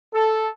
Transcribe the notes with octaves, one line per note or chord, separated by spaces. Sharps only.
A4